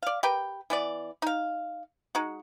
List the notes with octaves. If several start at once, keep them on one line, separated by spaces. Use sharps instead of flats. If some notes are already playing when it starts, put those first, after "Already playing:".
D5 F5
G4 A#4 B4 G5
E3 B3 D5
D#4 F5
G#3 D#4 F#4